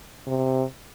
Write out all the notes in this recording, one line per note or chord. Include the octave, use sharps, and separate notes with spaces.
C3